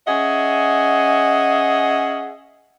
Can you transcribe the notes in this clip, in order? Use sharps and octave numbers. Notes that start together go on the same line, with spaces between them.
C#4 G#4 D#5 E5 F#5